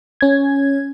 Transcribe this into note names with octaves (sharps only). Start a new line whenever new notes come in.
C#4 G#6